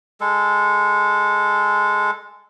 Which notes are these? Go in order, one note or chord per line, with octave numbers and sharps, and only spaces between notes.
G#3 A4